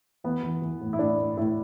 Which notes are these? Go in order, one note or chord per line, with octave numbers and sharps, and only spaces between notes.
E3 B3
E3
E3
A2
E4
A2 D4
A2
A2 E4